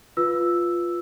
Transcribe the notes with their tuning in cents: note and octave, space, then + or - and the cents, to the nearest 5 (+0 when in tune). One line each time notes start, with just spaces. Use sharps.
F4 +0 B4 +0 E6 +0